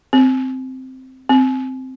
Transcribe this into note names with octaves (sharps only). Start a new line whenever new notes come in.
C4
C4